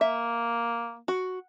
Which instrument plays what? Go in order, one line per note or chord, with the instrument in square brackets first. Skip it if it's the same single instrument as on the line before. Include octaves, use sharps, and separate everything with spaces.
[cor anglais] A#3 [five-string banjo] E5
[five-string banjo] F#4